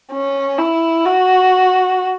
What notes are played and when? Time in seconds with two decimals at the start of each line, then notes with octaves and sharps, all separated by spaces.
0.12 C#4
0.58 E4
1.06 F#4